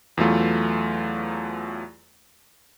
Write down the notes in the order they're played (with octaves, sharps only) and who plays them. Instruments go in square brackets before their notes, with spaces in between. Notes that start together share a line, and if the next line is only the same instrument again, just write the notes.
[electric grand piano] E2 E3 F#3 A3 F4